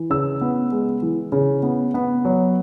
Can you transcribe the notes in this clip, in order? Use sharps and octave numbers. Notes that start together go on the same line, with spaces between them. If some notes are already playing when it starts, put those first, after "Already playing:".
Already playing: E3
C#3 E6
B3
G#3
E3
C#3
B3
B3
F#3